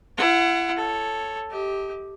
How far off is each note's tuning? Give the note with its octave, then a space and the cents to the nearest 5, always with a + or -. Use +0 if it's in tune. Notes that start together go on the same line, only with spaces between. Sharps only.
E4 +40 F#5 +0
A4 +0 C#5 +0
G4 +0 D#5 +40